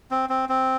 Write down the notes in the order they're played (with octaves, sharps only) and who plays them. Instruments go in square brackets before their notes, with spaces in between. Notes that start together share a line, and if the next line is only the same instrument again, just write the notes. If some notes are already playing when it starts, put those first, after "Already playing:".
[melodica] C4
C4
C4